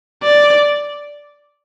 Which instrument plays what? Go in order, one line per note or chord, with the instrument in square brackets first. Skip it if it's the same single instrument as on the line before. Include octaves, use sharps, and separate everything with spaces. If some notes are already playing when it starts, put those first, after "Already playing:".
[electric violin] D5